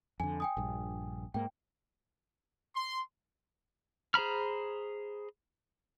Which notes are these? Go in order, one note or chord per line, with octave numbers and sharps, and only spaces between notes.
F2 D3 G#5
G5 G#5 D#6
A#1 G2
G#2 A#3 G5
C6
G#4 C5 A#5 B5 F6